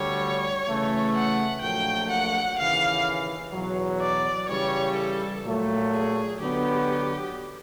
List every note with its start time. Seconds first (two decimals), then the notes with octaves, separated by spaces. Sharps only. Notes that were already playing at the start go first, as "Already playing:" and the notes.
Already playing: D2 D3 G3 C#5
0.67 C#3 E3 A3
1.15 F#5
1.62 A#1 A#2 F#3 A3 G5
2.10 F#5
2.58 D#2 C#3 E3 F5
3.53 E2 B2 F#3
4.01 D5
4.49 C#3 E3 G3 C#5
4.97 A4
5.44 A#2 F#3 A3
5.93 G#4
6.40 D3 F#3 B3 G4